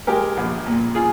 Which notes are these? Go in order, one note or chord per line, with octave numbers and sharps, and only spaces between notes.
G#3 G4 A#4
A#1
A#2
F4 G#4